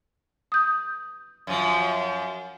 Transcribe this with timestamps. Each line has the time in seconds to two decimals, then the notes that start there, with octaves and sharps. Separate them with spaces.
0.52 D#6 G6
1.47 F#2 F3